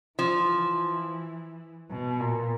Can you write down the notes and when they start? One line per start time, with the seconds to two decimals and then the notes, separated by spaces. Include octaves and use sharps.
0.19 E3 F3
1.91 B2
2.20 A#2